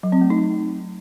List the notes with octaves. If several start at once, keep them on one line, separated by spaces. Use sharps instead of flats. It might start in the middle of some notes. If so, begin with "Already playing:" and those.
F#3
C4
A3
D#4